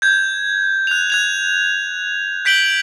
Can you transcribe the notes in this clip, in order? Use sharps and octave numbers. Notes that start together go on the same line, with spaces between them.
G6 G#6
F#6 F7
F#6 G#6 F7
G6 B6 D7 F#7 G7